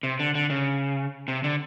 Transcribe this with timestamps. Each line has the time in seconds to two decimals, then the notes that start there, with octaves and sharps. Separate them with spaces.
0.03 C3
0.19 D3
0.35 D3
0.50 C#3
1.28 C3
1.44 D3